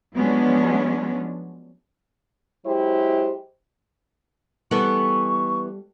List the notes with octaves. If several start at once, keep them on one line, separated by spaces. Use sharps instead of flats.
F3 F#3 G#3 B3 C#4 D4
F#3 G#3 E4 G4 C5
E3 G3 B3 A4 C#6